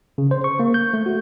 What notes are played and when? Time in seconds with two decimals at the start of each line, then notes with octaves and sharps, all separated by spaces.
0.18 C#3
0.31 C5
0.44 C#6
0.60 A#3
0.74 G6
0.93 A3
1.06 F#4